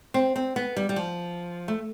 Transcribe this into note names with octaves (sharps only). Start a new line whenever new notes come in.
C4
C4
B3
G3
G3
F3
A3